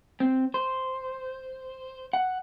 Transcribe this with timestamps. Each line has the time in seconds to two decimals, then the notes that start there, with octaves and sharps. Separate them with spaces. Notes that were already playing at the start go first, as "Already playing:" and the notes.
0.20 C4
0.54 C5
2.13 F#5